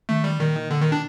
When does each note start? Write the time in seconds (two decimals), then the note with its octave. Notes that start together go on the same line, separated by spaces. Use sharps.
0.09 D#3 A3
0.24 G3
0.40 A#2 D#3
0.71 D3
0.82 D#3
0.92 D4